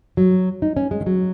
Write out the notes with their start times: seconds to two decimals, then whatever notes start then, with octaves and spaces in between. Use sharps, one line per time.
0.17 F#3
0.62 D#4
0.77 C#4
0.91 G#3
1.01 D#3
1.06 F#3